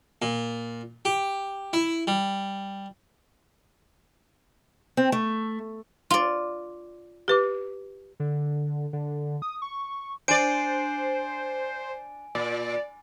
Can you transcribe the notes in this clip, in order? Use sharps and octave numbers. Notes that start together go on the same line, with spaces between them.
A#2
G4
E4
G3
C4
A3
F4 D5
G4 B4 D6
D3
D3
D#6
C#6
D4 C5 D5 G#5 D7
A#2 D5